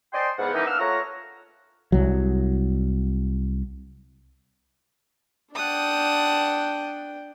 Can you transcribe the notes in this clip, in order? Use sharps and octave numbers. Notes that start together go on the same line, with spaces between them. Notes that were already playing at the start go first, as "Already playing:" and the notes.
C5 D5 D#5 G5 G#5 C6
E2 G#2 F3 B3 F#5
D#3 E3 G3 A#3 C#4 D#4
A#3 B3 D4 E6 F6
A3 F4 C#5 F#5 A#5
C2 F#3
D4 F#5 G5 A5 D#6